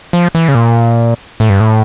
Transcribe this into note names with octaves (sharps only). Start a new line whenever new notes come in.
F3
E3
C#3
A#2
A2
G2
A2